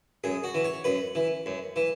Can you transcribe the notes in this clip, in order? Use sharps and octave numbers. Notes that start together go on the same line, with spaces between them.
F#2 G#4
F#4
E3
C#5
F#2 B4
E3
F#2
E3